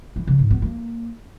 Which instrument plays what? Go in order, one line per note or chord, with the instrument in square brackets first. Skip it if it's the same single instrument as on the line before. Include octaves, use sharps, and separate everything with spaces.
[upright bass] E3
C#3
G#2
B3
A#3